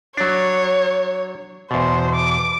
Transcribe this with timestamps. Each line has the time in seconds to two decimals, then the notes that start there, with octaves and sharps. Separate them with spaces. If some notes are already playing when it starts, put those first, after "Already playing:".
0.17 F#3 D4 C#5
1.71 E2 B2 C5
2.15 D6